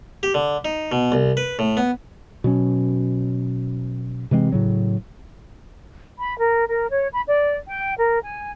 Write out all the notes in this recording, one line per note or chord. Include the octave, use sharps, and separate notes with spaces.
G4
D3
D#4
B2
C2
B4
A2
B3
B2 F#3 C#4
C3 E3 G#3 C4
A2 C#3 F#3
B5
A#4
A#4
C#5
B5
D5
G5
A#4
G#5